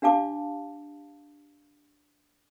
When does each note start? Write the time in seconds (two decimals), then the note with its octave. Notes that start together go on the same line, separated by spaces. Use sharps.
0.02 D4 G4 F5 A5 D6